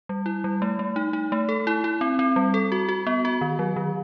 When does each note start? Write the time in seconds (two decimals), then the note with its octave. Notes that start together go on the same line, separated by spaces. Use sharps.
0.09 G3
0.26 E4
0.44 G3
0.62 A3
0.79 A3
0.96 D#4
1.13 D#4
1.32 A3
1.49 A4
1.67 E4
1.84 E4
2.01 C4
2.19 C4
2.36 G3
2.54 A4
2.72 F#4
2.89 F#4
3.07 B3
3.25 F#4
3.41 D#3
3.59 F#3
3.76 D#3